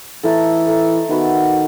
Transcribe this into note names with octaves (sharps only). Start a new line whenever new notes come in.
E3 A3 D#4 A4 E5
A3 D#4 A4 E5
D#3 B3 F#4 B4